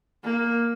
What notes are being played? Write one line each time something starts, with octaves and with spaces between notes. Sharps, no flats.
A#3